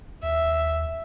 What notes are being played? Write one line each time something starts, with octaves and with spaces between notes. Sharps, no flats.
D#2 E5